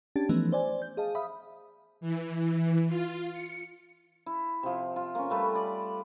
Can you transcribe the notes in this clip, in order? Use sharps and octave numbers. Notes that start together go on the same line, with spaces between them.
C#4 D4 G4 A5 A6
E3 F3 A3 B3 C#4 D#4
C5 D5 G#5
G6
G#4 D#5 F5 A5
E5 F5 B5 D#6
E3
E3
F4
C#7
E4
C3 F3
F4
A#3 C#4
G3 A3 B4
D5